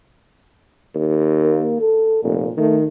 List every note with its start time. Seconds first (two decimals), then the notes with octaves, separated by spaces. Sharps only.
0.95 D#2
1.43 A#3
1.80 A4
2.23 F1 A#2
2.57 D#3 A3